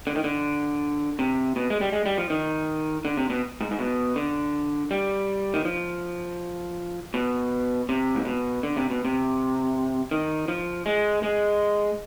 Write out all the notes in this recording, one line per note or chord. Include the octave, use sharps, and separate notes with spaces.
D3
D#3
D3
C3
B2
G#3
G3
G#3
G3
F3
D#3
D3
C3
B2
G#2
G#2
B2
D3
G3
D#3
F3
B2
C3
G#2
B2
D3
C3
B2
C3
D#3
F3
G#3
G#3